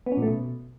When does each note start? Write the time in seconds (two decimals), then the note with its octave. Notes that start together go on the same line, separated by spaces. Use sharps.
0.06 B3
0.12 C#4
0.17 A#2
0.22 A3
0.28 B2